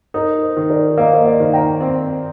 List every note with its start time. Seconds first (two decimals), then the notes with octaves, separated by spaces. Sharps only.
0.14 D#4 A#4
0.43 C5
0.57 D#3
0.70 A#4 D5
0.98 A#3 D#5
1.06 F5
1.13 C5 D#5
1.25 D5 F5
1.40 D#3
1.53 G5 A#5
1.80 C4